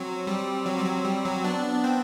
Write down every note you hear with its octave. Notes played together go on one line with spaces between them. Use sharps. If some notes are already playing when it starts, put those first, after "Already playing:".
Already playing: F#3 C4
G3
F#3
G3
F#3
G3
F#3
B3 D4
C4
B3
C4